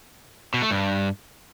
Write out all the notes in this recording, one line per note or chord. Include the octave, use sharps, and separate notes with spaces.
B2
A3
G2